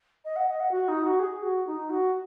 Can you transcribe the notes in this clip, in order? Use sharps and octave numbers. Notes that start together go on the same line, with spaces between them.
D#5
F#5
D#5
F#5
F#4
D#4
F#4
G#4
F#4
D#4
F#4